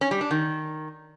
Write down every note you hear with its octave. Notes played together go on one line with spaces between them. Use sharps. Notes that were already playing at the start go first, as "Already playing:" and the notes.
C#4
G3
D4
D#3